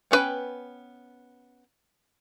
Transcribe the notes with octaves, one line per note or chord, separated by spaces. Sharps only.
B3 C#4 D#4 B4 G5